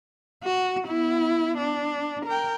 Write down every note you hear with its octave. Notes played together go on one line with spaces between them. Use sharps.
F#4
B3 E4
D4
A#4 G5